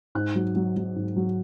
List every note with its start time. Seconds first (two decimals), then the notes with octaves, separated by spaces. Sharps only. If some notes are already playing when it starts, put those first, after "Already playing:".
0.15 G#2 F#6
0.35 F#3
0.56 F#3
0.76 F#3
0.96 G#2
1.16 F#3